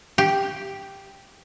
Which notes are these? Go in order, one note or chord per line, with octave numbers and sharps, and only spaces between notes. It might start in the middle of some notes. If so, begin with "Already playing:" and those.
G4